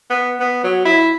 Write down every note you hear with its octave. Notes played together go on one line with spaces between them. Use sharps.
B3
B3
F#3
E4